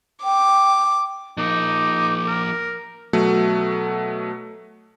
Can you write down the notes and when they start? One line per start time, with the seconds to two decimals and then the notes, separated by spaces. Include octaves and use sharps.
0.24 G5 D6
1.37 F3 A#3 D#4 D6
2.27 A#4
3.13 B2 F#3 A3